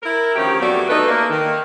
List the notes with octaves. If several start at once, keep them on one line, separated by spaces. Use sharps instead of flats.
E4 A#4
D2 D#3 F3 C#4 G4
F2 F#3 G3 A3 B3 D5
A3 D#4 B4
A#3
D#3